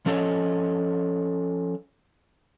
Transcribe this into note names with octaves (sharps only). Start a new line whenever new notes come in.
F3 C#4 A4 C#5 D#5